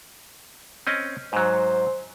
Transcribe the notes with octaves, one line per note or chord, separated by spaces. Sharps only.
C4 C#4 D#5
G#2 F#3 C5